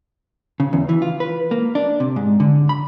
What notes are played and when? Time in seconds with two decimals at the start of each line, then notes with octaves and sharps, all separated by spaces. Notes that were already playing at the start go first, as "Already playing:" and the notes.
0.60 C#3
0.73 E2
0.89 E3
1.02 F4
1.20 B4
1.51 A#3
1.75 D4
2.00 C3
2.16 G#2
2.40 D3
2.69 B5